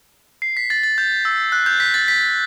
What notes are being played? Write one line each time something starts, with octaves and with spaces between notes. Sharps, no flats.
C7
B6
A6
A6
G6
E6
F#6
G6
B6
A6
B6